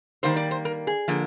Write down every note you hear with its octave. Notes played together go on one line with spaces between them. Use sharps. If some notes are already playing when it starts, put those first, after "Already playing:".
D#3 G3 A#3 C5
D5
C5
A#4
G#4
D3 F3 A#3